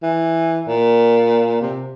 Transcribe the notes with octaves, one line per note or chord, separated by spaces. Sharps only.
E3
A#2
C3